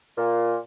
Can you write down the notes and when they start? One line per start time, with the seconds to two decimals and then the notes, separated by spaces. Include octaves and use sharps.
0.17 A#2